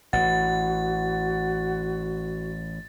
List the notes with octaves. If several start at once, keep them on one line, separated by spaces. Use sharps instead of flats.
A1 E3 F#4 F#5 A6